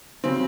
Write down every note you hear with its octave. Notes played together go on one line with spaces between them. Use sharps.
C#3 F#3 C4